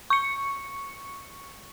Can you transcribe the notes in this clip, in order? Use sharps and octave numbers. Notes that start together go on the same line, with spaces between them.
C#6 C#7